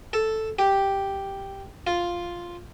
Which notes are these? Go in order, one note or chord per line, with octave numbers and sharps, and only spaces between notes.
A4
G4
F4